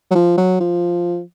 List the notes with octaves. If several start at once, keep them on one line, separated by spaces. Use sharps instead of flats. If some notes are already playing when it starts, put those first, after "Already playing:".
F#3
F3
F#3
F3